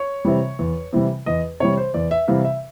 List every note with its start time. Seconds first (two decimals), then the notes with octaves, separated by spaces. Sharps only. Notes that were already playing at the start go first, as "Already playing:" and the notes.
Already playing: C#5
0.25 C3 E3 G3
0.59 E2
0.93 C3 E3 G3
1.26 E2 D#5
1.60 C3 E3 G3 C#5
1.77 C5
1.94 E2 D5
2.11 E5
2.28 C3 E3 G3 F5
2.44 E5